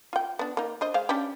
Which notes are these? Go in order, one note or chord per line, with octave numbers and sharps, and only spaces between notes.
F4 G5
B3 D4
A#3 D#4
D4 C5 D#5
G#3 C5 F5
C#4 D4 G4